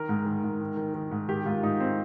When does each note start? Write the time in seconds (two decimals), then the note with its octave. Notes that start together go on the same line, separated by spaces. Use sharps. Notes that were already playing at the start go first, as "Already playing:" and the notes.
Already playing: D#3 A#4
0.09 G#2
0.26 D#3
0.43 G#2
0.60 D#3
0.77 D#3
0.94 D#3
1.11 G#2
1.28 D#3 G4
1.46 G#2 F4
1.63 G#2 D#4
1.80 C4